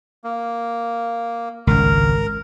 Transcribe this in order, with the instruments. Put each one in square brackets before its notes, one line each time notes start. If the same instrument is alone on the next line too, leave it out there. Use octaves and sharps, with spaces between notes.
[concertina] A#3
[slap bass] G#1 C#2 [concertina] A#4